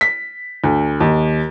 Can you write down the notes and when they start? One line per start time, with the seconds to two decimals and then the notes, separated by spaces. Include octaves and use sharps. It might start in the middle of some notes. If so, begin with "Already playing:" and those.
0.01 B6
0.64 D2
1.00 D#2